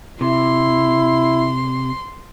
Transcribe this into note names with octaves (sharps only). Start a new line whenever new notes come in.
C3 E4 C6